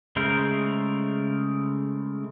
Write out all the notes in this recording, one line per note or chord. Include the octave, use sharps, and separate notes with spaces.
C#3 G#3 A3 A#4 C5